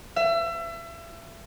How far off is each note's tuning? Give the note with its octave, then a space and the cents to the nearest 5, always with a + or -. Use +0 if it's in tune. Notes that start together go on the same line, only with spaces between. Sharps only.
E5 +30